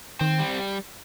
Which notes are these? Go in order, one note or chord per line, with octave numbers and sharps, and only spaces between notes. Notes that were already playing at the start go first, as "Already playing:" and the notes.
D#3 C4
G3